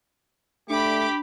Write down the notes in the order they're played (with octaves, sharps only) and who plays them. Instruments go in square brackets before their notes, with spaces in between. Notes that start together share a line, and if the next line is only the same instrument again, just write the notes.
[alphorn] A3 [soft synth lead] D4 [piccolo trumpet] G4 [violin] B5 D6